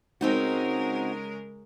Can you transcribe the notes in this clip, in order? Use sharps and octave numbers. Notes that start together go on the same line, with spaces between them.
C#3 G#3 C4 D#4 F#4 A#4